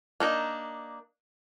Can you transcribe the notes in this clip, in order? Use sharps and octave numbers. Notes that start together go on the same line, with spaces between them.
A#3 D4 D#4